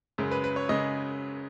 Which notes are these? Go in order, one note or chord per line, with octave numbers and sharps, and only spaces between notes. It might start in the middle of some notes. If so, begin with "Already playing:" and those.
F#2 C#3 G#3
B4
B4
C#5
C#3 G#3 D#5